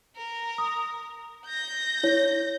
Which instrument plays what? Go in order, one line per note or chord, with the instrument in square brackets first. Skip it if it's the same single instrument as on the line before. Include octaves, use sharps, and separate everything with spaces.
[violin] A#4
[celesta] D#6
[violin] G6 A#6
[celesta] E4 C#5